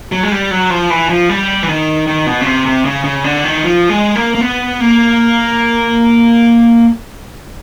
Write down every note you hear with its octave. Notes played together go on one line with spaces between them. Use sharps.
F#3
G#3
G3
F#3
F3
E3
F3
G3
E3
D#3
D#3
B2
C#3
C3
C3
C#3
C#3
D3
D#3
F3
G#3
A#3
A#3
B3
A#3